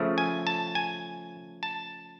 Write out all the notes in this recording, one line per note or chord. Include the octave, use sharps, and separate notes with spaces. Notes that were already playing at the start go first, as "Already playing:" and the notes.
Already playing: C#3 F3 A3
G#5
A5
G#5
A5